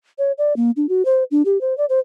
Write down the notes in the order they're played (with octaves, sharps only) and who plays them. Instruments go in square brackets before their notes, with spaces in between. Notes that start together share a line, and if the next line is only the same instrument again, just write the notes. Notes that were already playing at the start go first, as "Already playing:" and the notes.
[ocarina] C#5
D5
A#3
D4
F#4
C5
D4
G4
C5
D5
C5